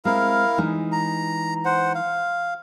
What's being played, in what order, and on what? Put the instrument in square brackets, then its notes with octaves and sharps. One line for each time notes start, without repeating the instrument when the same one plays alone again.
[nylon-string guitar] G#3 C4 [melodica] E4 A#4 F5
[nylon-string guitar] E3 G#3 D#4
[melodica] A#5
C5 F#5
F5